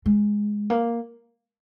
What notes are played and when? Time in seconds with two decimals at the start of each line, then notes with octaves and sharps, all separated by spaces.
0.06 G#3
0.70 A#3